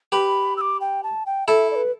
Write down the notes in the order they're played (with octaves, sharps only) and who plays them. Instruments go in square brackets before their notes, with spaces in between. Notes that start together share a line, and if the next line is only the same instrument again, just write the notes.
[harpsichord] G4 B4 [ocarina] B5
[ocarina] E6
D6
G5
A5
G5
[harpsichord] E4 A4 [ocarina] E5
[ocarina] D5
B4